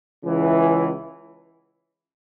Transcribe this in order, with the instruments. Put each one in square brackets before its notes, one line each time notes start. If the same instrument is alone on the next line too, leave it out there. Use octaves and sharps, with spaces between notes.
[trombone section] C#2 C#3 E3